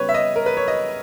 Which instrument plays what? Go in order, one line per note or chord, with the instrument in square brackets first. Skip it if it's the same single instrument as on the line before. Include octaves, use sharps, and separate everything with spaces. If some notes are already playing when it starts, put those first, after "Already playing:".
Already playing: [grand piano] C#3 G3 B3 B4 C#5
E5
D#5
A#4
B4
C#5
D#5